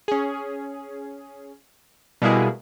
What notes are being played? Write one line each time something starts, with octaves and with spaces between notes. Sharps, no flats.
C#4 G#4
B2 G3 G#3 A#3 E4 G#4